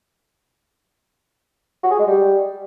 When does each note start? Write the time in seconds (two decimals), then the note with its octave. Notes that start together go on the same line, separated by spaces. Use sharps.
1.83 F#4
1.91 G#4
1.99 G#3
2.07 G3